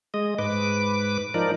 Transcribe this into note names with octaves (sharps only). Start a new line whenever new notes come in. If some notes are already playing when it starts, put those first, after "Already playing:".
G#3 D#5
G#2 B4 D6
F3 D#4 A#4 D5